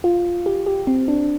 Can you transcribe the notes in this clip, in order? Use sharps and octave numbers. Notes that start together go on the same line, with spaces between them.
F4
G4
G4
C4
D4